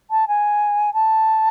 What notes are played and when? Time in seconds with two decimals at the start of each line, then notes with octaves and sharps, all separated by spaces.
0.10 A5
0.27 G#5
0.93 A5